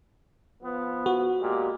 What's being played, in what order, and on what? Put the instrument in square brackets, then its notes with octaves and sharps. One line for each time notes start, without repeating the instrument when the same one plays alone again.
[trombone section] F3 B3
[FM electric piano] F#4
[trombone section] A#2 G#3 G4